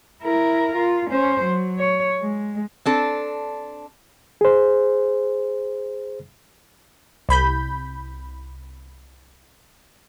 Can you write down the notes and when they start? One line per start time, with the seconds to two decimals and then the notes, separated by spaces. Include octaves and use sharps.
0.22 E4 A#4
0.76 F4
1.10 C#4 C5
1.42 F#3
1.78 C#5
2.21 G#3
2.85 C4 D4 A4
4.41 G#4 C5
7.29 C2 B5 G6